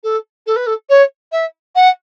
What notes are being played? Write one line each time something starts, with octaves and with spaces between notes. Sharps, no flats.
A4
A4
B4
A4
C#5
E5
F#5